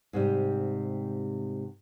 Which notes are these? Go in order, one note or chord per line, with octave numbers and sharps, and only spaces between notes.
G#2 C3 G3